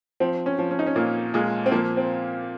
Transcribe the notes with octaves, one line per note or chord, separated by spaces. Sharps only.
F3 C4
C#4
F3
C#4
D#4
C#4
A#2 A#3
A#2 G#3
C4
F3 A#3
C4